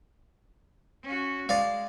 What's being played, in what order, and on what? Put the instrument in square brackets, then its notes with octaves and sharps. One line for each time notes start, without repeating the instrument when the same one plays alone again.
[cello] C#4 F#4
[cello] G#3 [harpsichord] D5 F5